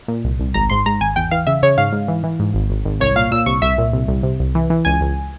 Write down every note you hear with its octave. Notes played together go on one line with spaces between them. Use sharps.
A#2
C2
C2
G#1 A#5
G#2 C6
G#2 A#5
G#1 G#5
E2 G5
E3 F5
C#3 E5
C#3 C#5
G#2 F5
G#2
E3
E3
G#2
G#1
G#1
G#1
C2 C#5
A#2 F5
A#2 E6
C2 C#6
C2 E5
A#2
C2
C2
C3
C2
E3
E3
C#2 G#5
C#2